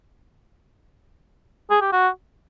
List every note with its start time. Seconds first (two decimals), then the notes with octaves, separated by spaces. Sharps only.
1.70 G#4
1.81 G4
1.92 F#4